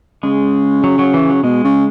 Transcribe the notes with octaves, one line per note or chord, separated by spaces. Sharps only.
C#3 G#3
F#3
F#3
E3
F#3
B2 G#3
C#3